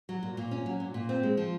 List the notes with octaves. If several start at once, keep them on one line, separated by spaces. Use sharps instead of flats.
F#3
A#2
A#2
C#4
F#3
A#2
A#2
C4
G#3
F3